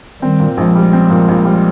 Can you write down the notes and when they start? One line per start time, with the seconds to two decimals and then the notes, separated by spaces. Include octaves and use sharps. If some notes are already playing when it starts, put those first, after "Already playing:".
0.22 D#3 G3 C4
0.40 A#2
0.57 A#1 F3 G#3
0.75 G3
0.93 C4
1.10 A#2
1.28 A#1
1.45 G3